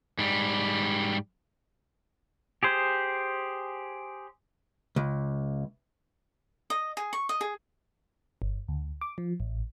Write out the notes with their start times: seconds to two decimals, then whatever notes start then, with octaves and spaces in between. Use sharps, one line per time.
0.19 G#2 G3
2.63 G4 G#4 C5
4.96 C#2
6.70 D#5
6.97 G#4
7.13 C#6
7.29 D#5
7.41 G#4
8.42 G1
8.68 D2
9.01 D6
9.18 F3
9.40 A1